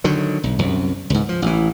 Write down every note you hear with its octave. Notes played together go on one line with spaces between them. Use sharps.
D3 D#3 F#3
B1
C2 F#2
C#2 G#2
F3
A1 E3